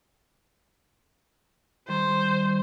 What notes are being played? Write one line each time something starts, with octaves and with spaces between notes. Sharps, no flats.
D#3 G3 C5